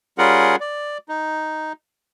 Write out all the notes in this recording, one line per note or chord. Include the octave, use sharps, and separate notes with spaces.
G3 C#4 F4 G#4 A#4 F#5
D5
D#4